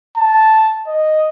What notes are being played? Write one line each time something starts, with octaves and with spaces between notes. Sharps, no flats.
A5
D#5